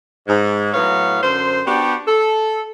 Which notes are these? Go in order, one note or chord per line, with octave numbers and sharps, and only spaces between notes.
G#2
A2 F#3 B3 C#5 F5
F#2 D3 C5
B3 D4 F#4 G4
A4